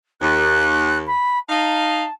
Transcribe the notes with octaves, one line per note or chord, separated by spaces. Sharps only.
D#2 F#6
B5
D#4 F5 A5